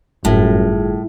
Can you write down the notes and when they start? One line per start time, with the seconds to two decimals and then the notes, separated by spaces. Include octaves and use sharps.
0.25 G1 F#2 A2 G3 F4 G#4